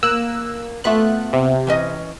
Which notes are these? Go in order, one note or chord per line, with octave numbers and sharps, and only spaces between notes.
A#3 E6 F#6
A3 B3 F4 E5 F#6
C3
E3 C#4 D#5